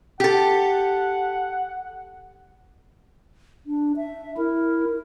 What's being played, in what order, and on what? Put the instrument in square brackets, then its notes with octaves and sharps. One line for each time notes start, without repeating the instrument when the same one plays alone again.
[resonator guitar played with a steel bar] G4 A4 [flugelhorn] F#5
[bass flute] D4
E5
[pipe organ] E4 [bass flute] A#4